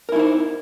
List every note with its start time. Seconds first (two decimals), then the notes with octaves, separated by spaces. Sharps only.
0.09 A#4
0.12 E4
0.16 D#4
0.19 C5